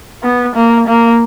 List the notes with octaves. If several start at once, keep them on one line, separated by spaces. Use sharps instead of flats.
B3
A#3
A#3